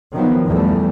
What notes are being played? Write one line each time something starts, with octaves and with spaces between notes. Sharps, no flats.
D#3 F3 F#3 B3
E2 G3 A3